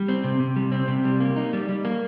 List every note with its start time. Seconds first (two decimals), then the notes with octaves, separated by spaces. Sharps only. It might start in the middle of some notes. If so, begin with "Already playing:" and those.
Already playing: G3
0.08 C4
0.24 C3
0.40 C3
0.56 G3
0.72 C4
0.88 C3
1.04 G3
1.20 A#3
1.36 D#4
1.53 G3
1.69 G3
1.85 A#3